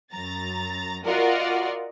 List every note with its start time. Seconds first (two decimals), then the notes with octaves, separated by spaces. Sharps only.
0.13 F#2 A#5 A6
1.05 F4 F#4 A#4 D5 D#5 F#5